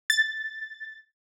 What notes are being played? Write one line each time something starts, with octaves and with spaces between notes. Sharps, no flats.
A6